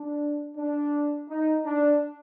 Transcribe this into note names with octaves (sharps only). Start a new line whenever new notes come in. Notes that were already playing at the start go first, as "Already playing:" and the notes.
Already playing: D4
D4
D#4
D4